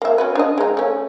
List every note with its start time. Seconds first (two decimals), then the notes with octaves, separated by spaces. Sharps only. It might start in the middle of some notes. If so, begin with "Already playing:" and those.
0.02 A#3 E5
0.18 C#4 F#4 B4
0.35 D4 D#5
0.58 G#3 D#4
0.77 A3 C#4